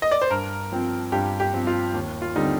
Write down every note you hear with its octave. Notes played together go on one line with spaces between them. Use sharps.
D#5
D5
C5
G2 A#4
F3 C4
G2 G4
G4
F3 C4
F4
D#2
F4
D3 G3 C4 D#4